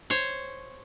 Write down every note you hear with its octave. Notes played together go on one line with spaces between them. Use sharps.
C5 C#5